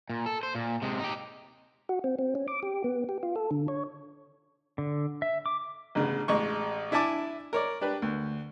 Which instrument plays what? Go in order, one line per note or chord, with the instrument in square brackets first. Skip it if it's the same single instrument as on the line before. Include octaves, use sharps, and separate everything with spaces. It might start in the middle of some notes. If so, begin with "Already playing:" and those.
[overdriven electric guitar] A#2
A4
C5
A#2
C3 G#3
D#4 G4
[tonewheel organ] F#4
C4
C4
C#4
D6
G4
B3
G4
F4
A4
D3
C#5
[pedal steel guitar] D3
E5
D6
[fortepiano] A1 C#3 B3
A1 G#3 C#6
D4 E4 E5 G#5 A5 D6
A#4 C#5 D5
D4 G4 B4
D2